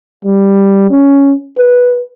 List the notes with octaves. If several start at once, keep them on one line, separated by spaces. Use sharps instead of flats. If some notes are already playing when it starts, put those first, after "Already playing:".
G3
C#4
B4